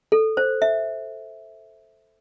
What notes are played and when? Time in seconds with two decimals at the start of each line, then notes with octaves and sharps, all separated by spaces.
0.12 A4
0.37 C5
0.62 E5